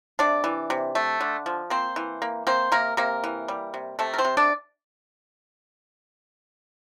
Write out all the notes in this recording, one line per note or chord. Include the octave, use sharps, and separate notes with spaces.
C3 D4 D5
E3
C3
A3
D3
F3
A#3 C4 C5
E3
A#3
A#3 C4 C5
C3 A#3 A#4
C3 A#3 A#4
E3
G3
C3
C3 A3 A4
A#4
C4 C5
C3
D4 D5